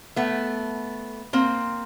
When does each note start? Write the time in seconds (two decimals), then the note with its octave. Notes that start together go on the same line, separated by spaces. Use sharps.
0.16 A3 B3
1.33 A#3 C4